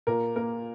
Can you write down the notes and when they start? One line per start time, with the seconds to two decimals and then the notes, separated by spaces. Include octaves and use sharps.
0.07 A#2 A#4
0.36 A#3 A#4